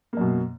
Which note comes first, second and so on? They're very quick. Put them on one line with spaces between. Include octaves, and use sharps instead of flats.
A#3 F#2 B2